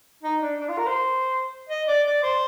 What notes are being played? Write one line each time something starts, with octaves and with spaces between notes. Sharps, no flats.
D#4
D4
D4
F4
A#4
C5
D#5
D5
D5
C5